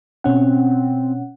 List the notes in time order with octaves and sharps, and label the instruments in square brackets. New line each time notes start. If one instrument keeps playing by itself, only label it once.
[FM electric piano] B2 C#4 F#5 [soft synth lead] C4